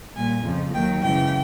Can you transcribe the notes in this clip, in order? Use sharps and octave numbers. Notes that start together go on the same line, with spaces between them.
A#2 G3 G#5
F2 C#3 F3
D#2 D#3 F#3 G5
F#2 C#3 E3 G#3 G5